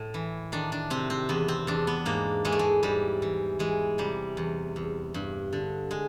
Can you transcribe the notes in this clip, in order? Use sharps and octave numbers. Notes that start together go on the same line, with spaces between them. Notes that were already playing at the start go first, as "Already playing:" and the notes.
Already playing: A2
E3
D#3 D4
D4
C3 C4
C4
E2 B3
C4
E2 D4
B3
G#2 A#3
E3 G#3
A3
G#3
G#2 G3
E3
E3 G#3
C3 G3
E2
E2
G2
D3
G#3